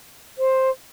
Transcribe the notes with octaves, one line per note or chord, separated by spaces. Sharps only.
C5